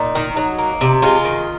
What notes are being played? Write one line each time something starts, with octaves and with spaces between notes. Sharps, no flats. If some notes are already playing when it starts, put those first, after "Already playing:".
Already playing: A#2 D#4
D#3
F#3
A#3
C3
G#3 F4
D#3